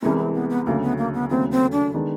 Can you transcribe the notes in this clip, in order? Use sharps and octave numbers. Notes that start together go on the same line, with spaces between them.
C2 C3 E3 G#3 B3 C#4
C4
B3
B3
D2 C#3 F#3 A#3
B3
A#3
B3
D#2 C#3 F#3 A3 C4
C4
D4
D#3 G#3 B3 D4